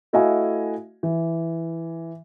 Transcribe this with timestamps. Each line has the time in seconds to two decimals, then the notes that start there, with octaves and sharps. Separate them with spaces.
0.13 A3 E4 F#4 D#5 F5 G#5
1.03 E3